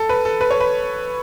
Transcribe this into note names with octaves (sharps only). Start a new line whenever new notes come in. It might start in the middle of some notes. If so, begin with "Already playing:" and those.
Already playing: A4
B4
A4
B4
C#5
B4